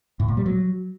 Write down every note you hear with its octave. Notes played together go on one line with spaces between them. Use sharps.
A2
A#2
G3
F#3